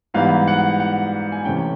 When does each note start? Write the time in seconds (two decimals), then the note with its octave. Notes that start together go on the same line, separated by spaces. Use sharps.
0.14 G#2 E3 G3 B3 D#4 F5
0.47 F#5
0.80 F#5
1.32 G#5
1.45 C3 E3 A3 C#4 G5